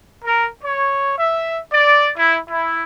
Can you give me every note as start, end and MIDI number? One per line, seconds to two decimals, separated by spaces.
0.25 0.48 70
0.64 1.17 73
1.19 1.59 76
1.73 2.12 74
2.17 2.38 64
2.49 2.84 64